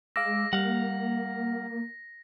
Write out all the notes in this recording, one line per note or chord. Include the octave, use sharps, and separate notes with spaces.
G#3 F5 D6 E6 A#6
G3 A#3 F5 F#5